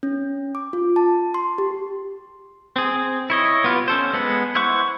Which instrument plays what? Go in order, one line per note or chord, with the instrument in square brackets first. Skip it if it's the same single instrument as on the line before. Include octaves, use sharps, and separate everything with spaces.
[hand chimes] C#4
D6
F4
A5
C6
G4
[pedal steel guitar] C4 G#4
E4 C#5 D#5
B3 F4 G4
C#4 A4 C5
G#3 B3 F#5
E4 C5 F#5 C#6